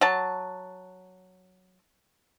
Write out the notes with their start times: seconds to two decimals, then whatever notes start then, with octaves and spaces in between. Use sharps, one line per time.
0.01 F#3 A5